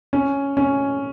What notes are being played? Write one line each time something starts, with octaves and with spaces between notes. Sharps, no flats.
C#4
C#4